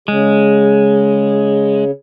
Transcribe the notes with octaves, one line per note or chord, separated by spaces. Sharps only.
C#3 G#3